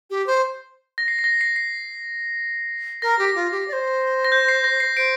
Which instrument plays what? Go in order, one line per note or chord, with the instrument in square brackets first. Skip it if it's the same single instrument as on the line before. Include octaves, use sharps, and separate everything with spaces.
[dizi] G4
C5
[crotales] A#6
C7
C7
A#6
C7
C7
[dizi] A#4 [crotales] A#6
[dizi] G4
F4
G4
D5
C5
[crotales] A#6
G6
C7
A#6
C7
[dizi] C5 [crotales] D7